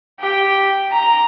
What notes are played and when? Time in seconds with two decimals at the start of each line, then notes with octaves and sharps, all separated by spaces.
0.20 G4 G5
0.91 A#5